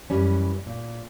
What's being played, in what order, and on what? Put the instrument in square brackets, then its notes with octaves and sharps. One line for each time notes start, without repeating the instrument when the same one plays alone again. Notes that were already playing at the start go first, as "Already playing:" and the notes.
[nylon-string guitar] F#2 E3 G3 C#4
A#2